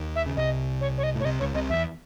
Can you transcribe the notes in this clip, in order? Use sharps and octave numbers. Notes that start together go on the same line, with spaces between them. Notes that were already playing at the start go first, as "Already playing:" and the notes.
Already playing: D#2 D#3
E5
C#3
C2 C3 D#5
C#5
C#5
D#5
A2 C#5
C2 C3 D#5
C#2 C#3 C#5
C2 C3 D#5
E2 E5